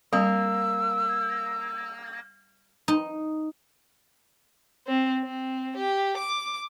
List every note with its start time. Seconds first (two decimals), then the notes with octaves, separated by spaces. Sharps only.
0.13 G3 A#3 C4 E6
2.88 D#4
4.87 C4
5.22 C4
5.77 G4
6.17 D6